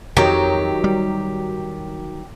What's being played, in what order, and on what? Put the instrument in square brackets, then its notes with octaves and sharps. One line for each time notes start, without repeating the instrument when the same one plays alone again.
[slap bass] F2 [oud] D#3 F#3 [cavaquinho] G4
[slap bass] G3